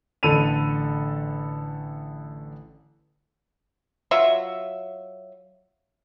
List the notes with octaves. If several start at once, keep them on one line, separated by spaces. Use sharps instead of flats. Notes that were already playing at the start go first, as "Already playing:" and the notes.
A1 D3 A4 B5 D#7 F7
F#3 F4 E5